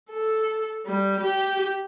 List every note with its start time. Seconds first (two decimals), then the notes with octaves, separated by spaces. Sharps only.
0.10 A4
0.86 G3
1.20 G4